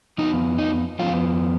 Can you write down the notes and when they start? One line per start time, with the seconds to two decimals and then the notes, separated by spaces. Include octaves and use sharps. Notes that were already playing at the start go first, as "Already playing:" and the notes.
0.18 F2 F3 B3 D#4
0.58 D#4
0.99 F2 F3 B3 C#4 F4